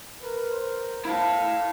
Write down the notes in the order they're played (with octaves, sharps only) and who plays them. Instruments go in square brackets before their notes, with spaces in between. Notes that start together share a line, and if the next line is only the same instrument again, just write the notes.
[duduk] A#4 [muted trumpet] B4
[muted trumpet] C5
[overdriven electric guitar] E4 A5 [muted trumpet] F5